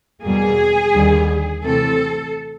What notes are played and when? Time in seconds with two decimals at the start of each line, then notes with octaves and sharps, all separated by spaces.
0.23 E2 B2 G3 A#3 G#4
0.93 D#2 D3 G3
1.63 C3 E3 A3 C4 A4